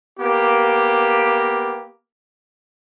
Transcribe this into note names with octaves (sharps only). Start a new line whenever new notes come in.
A#3 B3 G4